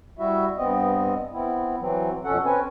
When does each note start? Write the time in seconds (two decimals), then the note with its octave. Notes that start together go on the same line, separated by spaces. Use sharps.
0.19 G3 E4 F#4 E5
0.57 G2 B3 C4 D#5
1.33 B3 C4 E4
1.80 E3 F#3 C4
2.25 F2 B2 C#4 A4 F#5
2.45 C4 C#4 B4 G#5